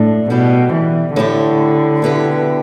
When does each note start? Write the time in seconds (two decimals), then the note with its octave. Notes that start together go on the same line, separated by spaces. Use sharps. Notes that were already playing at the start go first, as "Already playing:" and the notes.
Already playing: A2 A3 D4
0.30 B2 G3 E4 G4
0.73 E3
1.16 A2 D3 A3 E4 G4
2.02 B2 B3 E4 G4